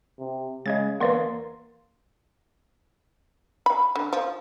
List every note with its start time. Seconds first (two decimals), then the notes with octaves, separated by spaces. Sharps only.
0.19 C3
0.66 C#3 G#3 D#5 G#6 A6
1.00 E2 D3 A#3 B4 D5 F#5 C6
3.66 B5
3.96 D3
4.13 F3